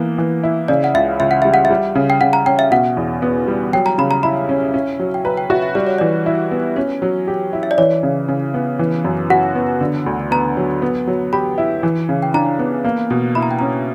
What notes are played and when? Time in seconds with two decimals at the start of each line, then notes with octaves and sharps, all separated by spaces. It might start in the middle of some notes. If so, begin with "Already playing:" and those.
Already playing: E3 A#3 B3
0.18 E3
0.43 E4
0.68 C#3 D5
0.84 F#5
0.94 C#2 E5
1.20 C#2 E5
1.31 F#5
1.42 G3 E5
1.54 F#5
1.65 E5
1.70 G3
1.95 C#3
2.10 G5
2.21 C#3 F#5
2.33 A#5
2.46 C#4 G5
2.59 E5
2.71 B2 F#5
2.97 E2
3.22 B3
3.48 G3
3.73 F#3 G5
3.86 A#5
3.98 C#3 B5
4.11 A#5
4.23 E4 B5
4.49 C#4
4.74 C#4
4.99 F#3
5.14 G5
5.25 B4 A#5
5.37 G5
5.50 F#4 E5
5.62 E5
5.75 G3 D5
5.87 C#5
5.98 E3 D5
6.26 E4
6.51 B3
6.76 C#4 B4
7.02 F#3
7.28 G4
7.53 E4
7.63 E5
7.71 D5
7.78 E3 C#5
8.03 C#3
8.28 C#3
8.54 B3
8.79 E3
9.05 F#2
9.30 F#4 F#5
9.55 B3
9.81 D3
10.06 D2
10.31 B3 A#5
10.57 F#3
10.82 B3
11.07 F#3
11.33 G4 B5
11.58 E4
11.83 E3
12.09 C#3
12.23 G5
12.34 D4 A#5
12.59 B3
12.84 A#3
13.10 B2
13.35 E4 B5
13.43 A#5
13.51 G5
13.59 C#4 A#5